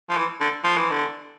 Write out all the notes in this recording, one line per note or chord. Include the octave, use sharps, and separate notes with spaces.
F3
E3
D3
F3
E3
D3